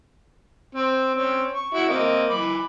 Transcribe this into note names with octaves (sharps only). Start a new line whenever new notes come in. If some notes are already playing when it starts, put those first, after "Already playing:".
C4
C4 C#4
C#6
E4 F#4
A#3 C4 D#5
E3 B5 D6